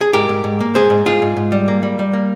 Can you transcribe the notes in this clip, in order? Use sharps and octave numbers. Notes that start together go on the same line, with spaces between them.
G#4
G#2 G4 A#4
G#2
G#2
A#3
G#2 G#4 C5
G#2
G#2 F4 G#4
G#2
G#2
G3
A#3
G3
G3
A#3